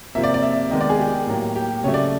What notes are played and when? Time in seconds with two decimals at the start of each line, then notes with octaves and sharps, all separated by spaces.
0.15 C3 F3 A#3 E5
0.23 D5
0.34 D5
0.43 E5
0.71 D#3 G#3 B3 D#5
0.81 D5
0.89 G#4
1.00 G4
1.27 A2 F#3 A#3
1.56 G4
1.84 C#3 F#3 A3 C#5
1.94 D5